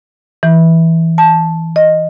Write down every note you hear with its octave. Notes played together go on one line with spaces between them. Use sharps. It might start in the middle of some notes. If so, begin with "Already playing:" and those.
E3
A5
D#5